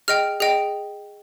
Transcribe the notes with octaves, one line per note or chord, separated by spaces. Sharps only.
G#4 D#5 G5 F6
G#4 D#5 G5